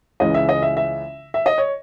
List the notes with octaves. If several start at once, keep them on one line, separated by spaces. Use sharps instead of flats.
C#2 C#3 E3 G#3 D#5
E5
D#5
E5
E5
E5
D#5
C#5